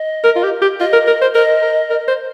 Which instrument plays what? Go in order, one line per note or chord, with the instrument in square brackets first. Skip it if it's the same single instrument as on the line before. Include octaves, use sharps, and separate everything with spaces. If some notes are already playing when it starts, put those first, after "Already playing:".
Already playing: [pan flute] D#5
[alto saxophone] A#4
F4
G4
G4
[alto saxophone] F4 [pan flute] D#5
[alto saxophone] A#4
A#4
C5
[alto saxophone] A#4 [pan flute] D#5
[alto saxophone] A#4
A#4
C5